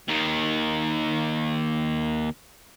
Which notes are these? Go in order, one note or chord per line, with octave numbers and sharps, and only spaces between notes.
D#2 D#3